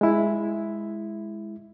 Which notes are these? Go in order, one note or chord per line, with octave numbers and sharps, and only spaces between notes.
G#3 E4